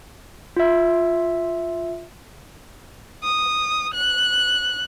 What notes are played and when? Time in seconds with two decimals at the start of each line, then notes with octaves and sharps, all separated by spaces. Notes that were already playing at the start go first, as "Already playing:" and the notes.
0.57 F4 E5
3.23 D#6
3.94 F#6